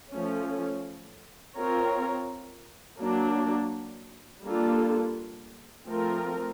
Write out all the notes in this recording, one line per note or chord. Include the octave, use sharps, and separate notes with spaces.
F3 A3 C#4
C4 F4 A#4 C#5
F#3 A#3 D4
G3 A#3 D4 F4 A4
F3 A3 C4 F4 A#4